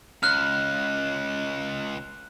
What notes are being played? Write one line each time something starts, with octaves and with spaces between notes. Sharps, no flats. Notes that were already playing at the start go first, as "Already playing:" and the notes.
C#2 F6 F#6